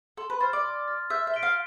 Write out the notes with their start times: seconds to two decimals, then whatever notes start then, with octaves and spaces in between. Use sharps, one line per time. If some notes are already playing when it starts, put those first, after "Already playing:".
0.17 A4 C6
0.30 B4
0.40 C5 F6 A6
0.53 D5
0.64 C6
0.88 F6 A6
1.10 E5 G6
1.27 E5
1.34 B6 D7 G7
1.43 F5